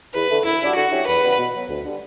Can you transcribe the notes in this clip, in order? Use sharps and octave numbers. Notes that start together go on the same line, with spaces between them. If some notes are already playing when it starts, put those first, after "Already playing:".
E2 B4
D3 A3
F#2 E4
C#3 G3 D4 F#4
D3 F#4
F#3 C#4 E4 G4
E2 B4
C#3 G3 B3 F#4
B2
F#3 B3
D2
D3 G3